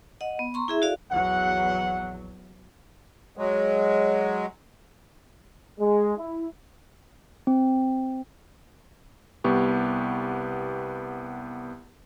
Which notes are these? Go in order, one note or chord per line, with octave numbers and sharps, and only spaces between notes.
D#5 F#5
B3
A#5 C6 C#6
E4 G#4 E5
F#4 A4 D5 F5
A#1 E2 F#3 F#5
F#3 G#3
G#3
E4
C4
C2 B3 G4 C#6